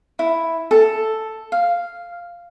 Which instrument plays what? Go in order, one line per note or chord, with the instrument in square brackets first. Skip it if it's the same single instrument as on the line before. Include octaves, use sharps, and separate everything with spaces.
[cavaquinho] E4
A4
F5